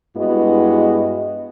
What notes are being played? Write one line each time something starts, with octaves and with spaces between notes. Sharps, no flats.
G2 G#3 B3 E4 F#4 D#5